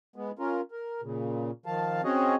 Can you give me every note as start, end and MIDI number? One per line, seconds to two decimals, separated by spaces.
0.16 0.31 56
0.16 0.31 59
0.39 0.61 61
0.39 0.61 65
0.39 0.61 70
0.71 1.01 70
1.02 1.51 46
1.02 1.51 49
1.66 2.01 51
1.66 2.01 53
1.66 2.01 77
1.66 2.01 81
2.04 2.35 60
2.04 2.35 61
2.04 2.35 66
2.04 2.35 68
2.04 2.35 73
2.04 2.35 75